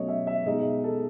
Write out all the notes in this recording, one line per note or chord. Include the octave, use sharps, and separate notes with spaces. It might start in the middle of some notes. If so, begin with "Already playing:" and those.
Already playing: B2 F#3 A3 C#4 C#5 D#5
E5
E5
B2 G#3 D#4 D#5
A4